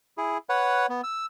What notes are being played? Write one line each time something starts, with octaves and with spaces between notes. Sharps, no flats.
E4 G#4
B4 C#5 F#5
B3
E6